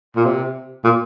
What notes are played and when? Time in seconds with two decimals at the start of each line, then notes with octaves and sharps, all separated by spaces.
0.16 A#2
0.25 C3
0.84 A#2